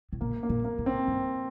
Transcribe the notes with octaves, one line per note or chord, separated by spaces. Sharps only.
A2
A#2 A#3
A#3
A#2
A#3
A2
C4
G2